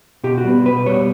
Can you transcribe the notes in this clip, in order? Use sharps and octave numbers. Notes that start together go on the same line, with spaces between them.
B2 G4
F#4
G3 B3
B2 B4
G3 B3 C#5